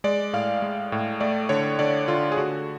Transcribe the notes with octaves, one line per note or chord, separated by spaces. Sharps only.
G#3 D5
A2 F5
G#3
A2
A3 D5
D3 C#5
D3 D5
D3 F4
G#4
D3 F#4